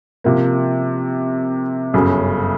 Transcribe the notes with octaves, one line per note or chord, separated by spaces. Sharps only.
C3 F3 A#3
G1 F#2 C#3